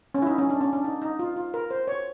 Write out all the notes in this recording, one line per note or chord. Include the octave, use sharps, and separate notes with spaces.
C#4
E4
D#4
C#4
D4
C#4
D4
D#4
D#4
F4
F4
A#4
C5
C#5